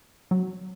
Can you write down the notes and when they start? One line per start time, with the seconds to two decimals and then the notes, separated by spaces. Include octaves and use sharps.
0.31 F#3